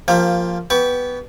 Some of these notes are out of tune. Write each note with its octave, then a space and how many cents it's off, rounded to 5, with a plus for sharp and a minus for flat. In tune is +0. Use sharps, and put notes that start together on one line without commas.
F3 +0 A#3 -10 G4 +25
B3 +0 G4 +0 C#6 +35